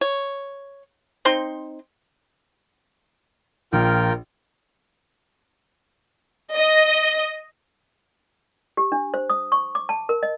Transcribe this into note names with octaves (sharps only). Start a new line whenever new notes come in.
C#5
C4 D#4 C6
A#1 F4 A#4 G5
D#5
G4
D4
C5
D#6
C#6
D6
A5
A#4
D#5